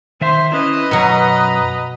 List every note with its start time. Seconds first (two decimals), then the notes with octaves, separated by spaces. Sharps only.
0.21 D#3 C5 E5
0.52 C#4 E4 B4 D#5
0.91 F#2 B2 F#3 A#5